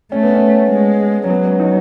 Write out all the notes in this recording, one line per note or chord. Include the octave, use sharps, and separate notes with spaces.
A3 C#4
B3
C#4
G#3
C#4
F#3 B3
C#4
D#4